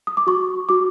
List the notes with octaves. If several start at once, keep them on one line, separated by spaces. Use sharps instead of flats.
D#6
D6
F#4 C#6
F#4 D6